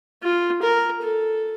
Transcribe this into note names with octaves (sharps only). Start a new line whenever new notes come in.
F4
A#4
A4